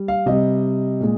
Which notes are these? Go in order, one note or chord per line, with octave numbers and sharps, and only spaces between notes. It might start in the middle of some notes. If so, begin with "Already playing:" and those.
Already playing: G3
F5
C3 G3 D#5
A#2 G#3